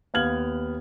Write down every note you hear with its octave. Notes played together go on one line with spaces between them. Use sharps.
D#2 B3 F5 F6 G#6 F#7